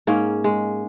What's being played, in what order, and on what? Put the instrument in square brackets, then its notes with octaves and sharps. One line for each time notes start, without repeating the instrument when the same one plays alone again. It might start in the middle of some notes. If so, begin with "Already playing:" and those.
[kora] G#2 A#3 C#4
G#3